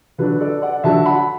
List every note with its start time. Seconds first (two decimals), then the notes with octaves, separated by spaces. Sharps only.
0.18 D3 F#3 D4 B4
0.40 A4 D5
0.62 D5 F#5
0.84 D3 F#3 D4 E5 A5
1.06 F#5 B5